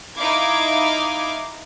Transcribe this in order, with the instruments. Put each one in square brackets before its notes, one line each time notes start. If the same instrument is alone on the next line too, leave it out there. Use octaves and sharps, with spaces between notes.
[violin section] D#4 E4 F5 D6 G#6